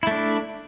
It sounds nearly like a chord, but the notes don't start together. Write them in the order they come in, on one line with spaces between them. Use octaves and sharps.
E4 A3 D4